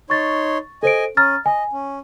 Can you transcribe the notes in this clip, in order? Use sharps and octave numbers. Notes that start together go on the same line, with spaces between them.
D#4 C#5 C6 C#6 A6
A4 C5 D#5 G#5 D7
C#4 A#5 F6 A6
D#5 G#5
C#4